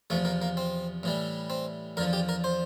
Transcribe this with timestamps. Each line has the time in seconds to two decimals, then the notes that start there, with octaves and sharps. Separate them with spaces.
0.10 E2 C3 F3 A3
0.25 A#3
0.42 A#3
0.57 C4
1.03 A2 E3 G3
1.50 C4
1.97 E2 D3 F3 A#4
2.13 G4
2.29 A#4
2.44 C5